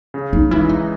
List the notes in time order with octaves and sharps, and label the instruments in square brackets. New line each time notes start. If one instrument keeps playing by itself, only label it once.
[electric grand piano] C#3
[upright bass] D#4
[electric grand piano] E3 G#3 [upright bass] E4
[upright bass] D#4